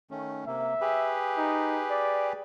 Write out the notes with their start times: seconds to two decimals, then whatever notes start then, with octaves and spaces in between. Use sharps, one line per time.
0.11 D#3 A3 C#4
0.47 C3 A#3 E5
0.81 G4 G#4 B4
1.38 D#4
1.90 D5